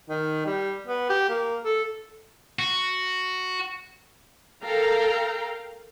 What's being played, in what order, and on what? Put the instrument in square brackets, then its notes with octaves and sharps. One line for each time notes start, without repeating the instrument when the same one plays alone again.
[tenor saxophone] D#3
G3
B3
G4
A#3
A4
[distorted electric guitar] F#4
[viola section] A4 A#4 F5 G5 A#5